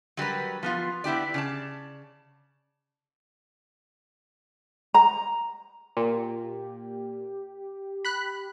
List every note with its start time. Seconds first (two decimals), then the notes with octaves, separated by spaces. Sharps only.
0.17 F#3 G3 A#4 B4
0.63 F3 B3 F4
1.04 B3 E4 G4 D5
1.34 C#3 D5 A5
4.94 A#5
5.97 A#2 G4
8.05 B5 F#6